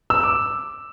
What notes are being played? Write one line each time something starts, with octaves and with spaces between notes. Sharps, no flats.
E6
D6